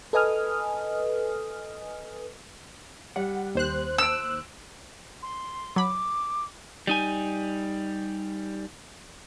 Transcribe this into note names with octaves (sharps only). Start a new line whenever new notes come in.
A4 B4 D#5 G#5 D#6 F6
G3 F#5
D#2 C5 F#6
E6 D7 E7
C6
F#3 B5 D6
G3 D#4 G#5